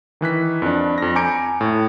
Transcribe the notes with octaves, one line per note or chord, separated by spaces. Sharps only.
D#3 E3 F#6 B6
F2 D4
F2 A#6
G#5 A#5 D6 G6 C#7 D7
A2